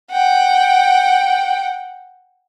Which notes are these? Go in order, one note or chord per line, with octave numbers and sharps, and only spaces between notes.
F#5 G5